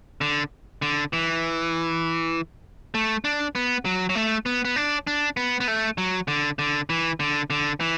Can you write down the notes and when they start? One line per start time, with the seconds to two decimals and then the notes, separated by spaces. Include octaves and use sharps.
0.21 D3
0.82 D3
1.13 E3
2.95 A3
3.24 D4
3.55 B3
3.85 F#3
4.09 F#3
4.15 A3
4.46 B3
4.65 B3
4.76 D4
5.07 D4
5.37 B3
5.60 B3
5.68 A3
5.98 F#3
6.28 D3
6.59 D3
6.90 E3
7.20 D3
7.50 D3
7.80 E3